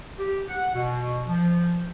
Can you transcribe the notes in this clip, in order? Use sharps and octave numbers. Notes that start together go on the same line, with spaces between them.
G4
F#5
B2
F3